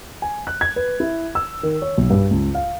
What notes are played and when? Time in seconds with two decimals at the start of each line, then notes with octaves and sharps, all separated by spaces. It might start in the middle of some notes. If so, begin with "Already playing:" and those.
0.22 G#5
0.47 F#6
0.61 G#6
0.76 B4
1.00 E4
1.35 E6
1.63 D#3
1.82 C#5
1.98 B1
2.10 G2
2.31 C#2
2.55 F5